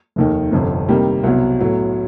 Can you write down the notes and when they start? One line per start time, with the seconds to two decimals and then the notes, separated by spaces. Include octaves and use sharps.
0.16 F1 D#2 D#3
0.52 G1 F2 C3
0.89 C3 D#3 G3 A#3
1.23 C2 B2 F#3 B3
1.60 A2 F#3 B3